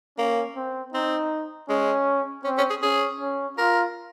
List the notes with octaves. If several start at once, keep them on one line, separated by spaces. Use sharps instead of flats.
A#3 C#4
C4
C4 D#4
G#3 C#4
C4 C#4
C#4
G#4
C#4 G#4
C#4
F4 A#4